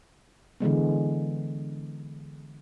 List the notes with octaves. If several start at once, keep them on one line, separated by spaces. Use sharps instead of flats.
D3 E3 G#3 B3